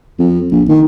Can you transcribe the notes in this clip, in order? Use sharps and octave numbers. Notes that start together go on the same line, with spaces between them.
F2
A#1
D#3